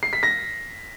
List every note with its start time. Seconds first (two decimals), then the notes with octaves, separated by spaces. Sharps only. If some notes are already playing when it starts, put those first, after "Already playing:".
0.03 C7
0.13 B6
0.23 A#6